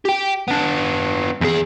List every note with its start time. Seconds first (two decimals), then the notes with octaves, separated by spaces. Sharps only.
0.05 G4 G5
0.48 B3 D4
1.41 E2 G#4